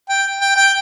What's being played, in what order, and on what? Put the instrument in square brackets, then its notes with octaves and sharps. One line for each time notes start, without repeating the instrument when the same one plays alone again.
[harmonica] G5
G5
G5